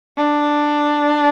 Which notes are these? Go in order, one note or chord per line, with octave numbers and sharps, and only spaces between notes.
D4